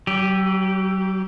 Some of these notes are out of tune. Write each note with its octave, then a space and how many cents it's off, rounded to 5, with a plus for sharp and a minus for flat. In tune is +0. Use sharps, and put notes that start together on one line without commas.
F#3 +40 G4 +0